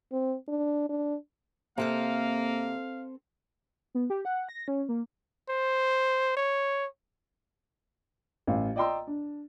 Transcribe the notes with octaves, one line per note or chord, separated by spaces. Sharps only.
C4
D4
D4
C3 A#3 C4 A4 C5 F5
B3
G4
F#5
A#6
C#4
A#3
C5
C#5
A1 F5
D5 D#5 G5 A#5 C6 E6
D4